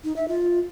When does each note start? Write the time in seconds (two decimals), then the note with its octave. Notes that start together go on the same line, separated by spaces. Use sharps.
0.04 D#4
0.16 E5
0.28 F4